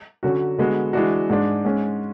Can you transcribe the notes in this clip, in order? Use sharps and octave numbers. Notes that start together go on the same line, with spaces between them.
D3 F#3 C#4 F#4
D3 G#3 B3 F#4
E3 G#3 D4 F#4
G#2 G#3 D4
G#2 G#3 C#4